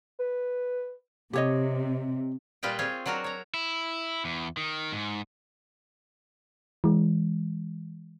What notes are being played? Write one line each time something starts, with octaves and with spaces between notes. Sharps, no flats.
B4
C3 G4 C#5 D#5
A#2 G3 F4 B4 D#5 G5
C4 F4 G#4 C#5
F#3 D4 F#4 A#4
C#5 A#5
E4
E2
D#3
G#2
E3 G#3